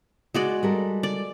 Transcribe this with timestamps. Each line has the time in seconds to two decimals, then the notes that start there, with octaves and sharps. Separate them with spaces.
0.34 G#3 F#4 D5
0.63 G3 A4 A#4
1.03 D5